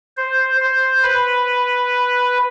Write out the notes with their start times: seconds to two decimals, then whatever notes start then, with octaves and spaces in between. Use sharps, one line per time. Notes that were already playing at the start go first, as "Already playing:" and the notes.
0.17 C5
0.60 C5
1.03 B4